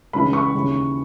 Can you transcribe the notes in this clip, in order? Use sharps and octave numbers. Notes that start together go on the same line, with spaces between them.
C#2 C#3 E3 B5
C#6
D#2 C#3 E3